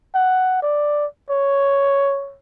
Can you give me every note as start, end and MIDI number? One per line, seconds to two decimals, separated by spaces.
0.14 0.58 78
0.62 1.05 74
1.30 2.37 73